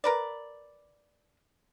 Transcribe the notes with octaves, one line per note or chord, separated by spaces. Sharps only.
A#4 B4 D5